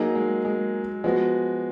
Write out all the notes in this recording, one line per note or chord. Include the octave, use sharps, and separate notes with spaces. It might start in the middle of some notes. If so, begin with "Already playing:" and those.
Already playing: F#3 A#3 D#4 G#4
G#3
G#3
F3 G#3 B3 F#4